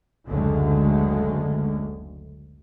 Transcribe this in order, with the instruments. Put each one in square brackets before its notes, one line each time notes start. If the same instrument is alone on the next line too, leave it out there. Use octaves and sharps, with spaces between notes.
[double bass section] F#1 D2 D3 G#3 A3